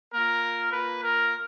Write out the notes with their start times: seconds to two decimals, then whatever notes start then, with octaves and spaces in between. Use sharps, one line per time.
0.12 A#3 F4 A#4
0.72 A#3 F4 B4
1.02 A#4